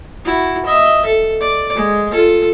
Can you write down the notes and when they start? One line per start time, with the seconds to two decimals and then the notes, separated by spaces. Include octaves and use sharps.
0.25 E4 F#4
0.66 D#5 E5
1.05 A4
1.40 D5
1.75 G#3
2.11 F4 A4